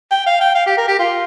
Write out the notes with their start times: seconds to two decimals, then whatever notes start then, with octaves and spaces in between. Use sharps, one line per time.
0.11 G5
0.26 F5
0.41 G5
0.55 F5
0.66 G4
0.77 A#4
0.88 G4
0.99 F4